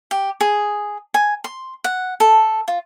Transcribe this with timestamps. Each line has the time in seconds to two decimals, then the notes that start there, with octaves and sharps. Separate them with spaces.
0.11 G4
0.41 G#4
1.14 G#5
1.44 C6
1.84 F#5
2.20 A4
2.68 F4